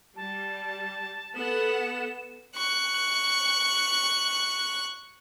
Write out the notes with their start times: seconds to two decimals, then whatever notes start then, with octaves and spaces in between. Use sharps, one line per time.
0.16 G3 A5
1.35 B3 A4 F#5 E7
2.56 C#6 F#6